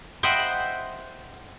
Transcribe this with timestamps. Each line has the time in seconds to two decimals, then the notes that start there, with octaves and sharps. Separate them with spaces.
0.23 C5 D#5 E5 F#5 G5 B5